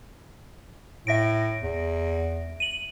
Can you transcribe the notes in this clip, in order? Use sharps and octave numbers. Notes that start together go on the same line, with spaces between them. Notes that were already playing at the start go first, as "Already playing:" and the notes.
A2 E5 A#6 D7
E2
D#7 F#7